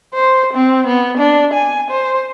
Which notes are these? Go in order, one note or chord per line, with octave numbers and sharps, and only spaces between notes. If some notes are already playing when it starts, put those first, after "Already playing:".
C5
C4
B3
D4
G#5
C5